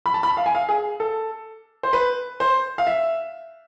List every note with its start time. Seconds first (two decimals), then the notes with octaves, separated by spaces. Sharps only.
0.06 B5
0.14 A5
0.23 B5
0.37 F5
0.46 G#5
0.55 F5
0.69 G#4
1.00 A4
1.83 C5
1.93 B4
2.40 C5
2.78 F5
2.87 E5